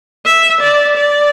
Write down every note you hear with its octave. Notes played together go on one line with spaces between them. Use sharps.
E5
D5
D5